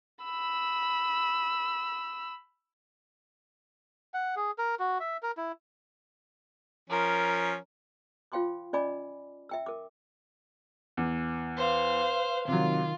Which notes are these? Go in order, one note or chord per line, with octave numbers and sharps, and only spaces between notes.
B5 E6
F#5
G#4
A#4
F#4
E5
A#4
E4
F3 C#4 A#4
F4 C5 F5 G5 C6 D6
C#4 D5 D#5 G#5 B5 D6
E5 G5 E6
A#4 D6
E2
B4 C5 F5
C3 D#3 F#3 F4